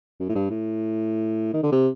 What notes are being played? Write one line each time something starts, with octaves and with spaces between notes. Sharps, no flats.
F#2
A2
G2
A2
D#3
D3
C3